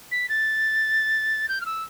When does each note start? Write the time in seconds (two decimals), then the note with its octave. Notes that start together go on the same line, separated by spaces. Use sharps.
0.11 B6
0.28 A6
1.48 G6
1.61 F6
1.65 E6